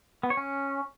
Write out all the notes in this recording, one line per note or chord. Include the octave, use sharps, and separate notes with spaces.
B3
C#5
C#4